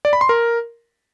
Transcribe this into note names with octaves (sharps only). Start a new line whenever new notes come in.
D5
B5
C6
A#4